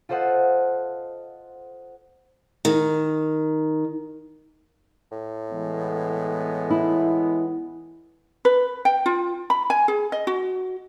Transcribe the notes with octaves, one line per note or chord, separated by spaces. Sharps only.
F4 A4 C5 D#5 F#5
D#3
A2
E3 G#3 B3
E4
B4
G5
F4
B5
G#5
G#4
D#5
F#4